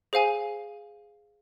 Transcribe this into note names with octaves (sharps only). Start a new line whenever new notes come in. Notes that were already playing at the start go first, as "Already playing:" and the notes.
G#4 C5 F5 G#5